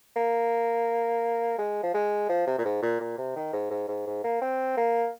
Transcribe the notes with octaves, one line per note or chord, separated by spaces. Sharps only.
A#3
G#3
F3
G#3
F3
C3
A#2
G#2
A#2
A#2
C3
D#3
G#2
G#2
G#2
G#2
A#3
C4
A#3